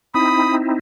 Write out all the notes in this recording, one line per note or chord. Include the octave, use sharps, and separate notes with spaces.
C4 D#4 E4 B5 D#6